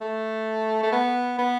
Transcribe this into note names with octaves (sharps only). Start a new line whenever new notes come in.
A3
A3
B3
B3